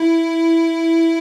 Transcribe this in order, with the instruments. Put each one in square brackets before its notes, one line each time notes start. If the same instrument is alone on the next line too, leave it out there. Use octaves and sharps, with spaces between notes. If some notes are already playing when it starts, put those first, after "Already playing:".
Already playing: [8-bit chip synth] E4